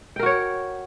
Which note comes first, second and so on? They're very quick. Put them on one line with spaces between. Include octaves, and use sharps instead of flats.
G5 A#4 F#4 C#5